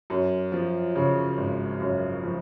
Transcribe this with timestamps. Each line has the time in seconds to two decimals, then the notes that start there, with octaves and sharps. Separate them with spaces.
0.10 F#2
0.52 F3
0.96 C#3
1.37 G#1
1.80 F#2
2.23 F3